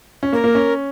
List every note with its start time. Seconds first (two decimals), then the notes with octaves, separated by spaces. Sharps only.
0.23 C#4
0.33 A#3 A#4
0.44 A#3
0.55 C#4